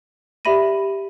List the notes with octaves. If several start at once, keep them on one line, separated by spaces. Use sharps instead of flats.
G4 D5 E5 B5 A#6 D#7